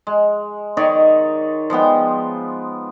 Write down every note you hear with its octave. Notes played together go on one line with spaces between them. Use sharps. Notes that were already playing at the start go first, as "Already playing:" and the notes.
G#3
D#3 D#4 C#5 D5
F3 G#3 B3 G5